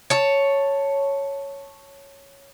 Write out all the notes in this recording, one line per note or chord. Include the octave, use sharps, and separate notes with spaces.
C#5 A5